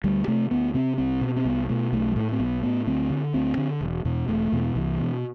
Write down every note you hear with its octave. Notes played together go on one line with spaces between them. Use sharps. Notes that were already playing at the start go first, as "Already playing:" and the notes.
D2 G3
C3 A3
D2 B3
C3 C4
C2 C4
B2
C4
C2 B3
B2 A3
B1 A3
G3
A2 A3
C4
B1 B3
A2 B3
D2 C4
D3
D2 C4
D3
E1
E2 B2
E1 A3
E2 B2
C2 E3
B2